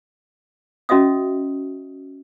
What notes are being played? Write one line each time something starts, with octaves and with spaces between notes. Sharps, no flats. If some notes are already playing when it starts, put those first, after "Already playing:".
C#4 F#4 D#5 E5 D#6